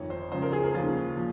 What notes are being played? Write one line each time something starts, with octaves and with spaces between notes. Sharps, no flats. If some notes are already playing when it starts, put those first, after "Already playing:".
Already playing: G1 F2 D#3 C#5
C5
C#2 C#3 F3 C5
A#4
G#4
A#4
D#2 C#3 F3 F4
A#2 F3